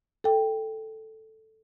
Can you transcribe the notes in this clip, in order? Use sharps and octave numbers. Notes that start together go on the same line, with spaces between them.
A4 G5